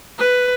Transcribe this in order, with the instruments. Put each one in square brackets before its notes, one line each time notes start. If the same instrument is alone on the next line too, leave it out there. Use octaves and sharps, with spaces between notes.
[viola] B4